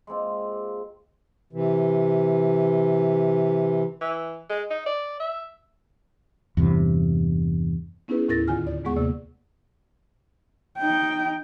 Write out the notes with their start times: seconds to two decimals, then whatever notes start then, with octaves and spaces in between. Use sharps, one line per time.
0.07 G#3 A#3 C4 F4
1.53 C3 E3
4.01 E3
4.50 G#3
4.70 D#4
4.86 D5
5.20 E5
6.57 E2 G2 C3
8.08 B3 C#4 D#4 E4 G#4 B4
8.28 D#2 A2 E4 A#4 A6 A#6
8.48 D2 D3 D#3 F4 G#5 F6
8.67 D5
8.84 D#2 G#3 B3 G#4 F#5 C#6
8.96 D#2 C3 A#3 D5
10.78 D#4 G5